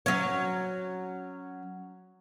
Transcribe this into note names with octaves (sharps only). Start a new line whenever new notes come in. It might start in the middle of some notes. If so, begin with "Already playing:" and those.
F#3 C#4 C#5